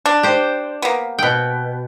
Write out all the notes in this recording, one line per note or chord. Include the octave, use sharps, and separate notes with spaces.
D4
G4 C5
A#3 B3
B2 G5